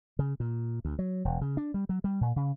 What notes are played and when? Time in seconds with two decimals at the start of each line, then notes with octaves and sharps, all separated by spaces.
0.19 C#3
0.40 A#2
0.85 D2
0.99 F#3
1.25 E1
1.41 C#3
1.57 D4
1.74 G3
1.89 F#3
2.04 G3
2.21 A#2
2.36 C#3